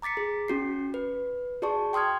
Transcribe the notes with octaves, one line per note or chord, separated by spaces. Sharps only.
A#5 D6 A6 B6 C#7
G#4
C#4 F#4 C7
B4
F#4 G#4 D5 A5 C#6
G5 C6 D#6 F6 G#6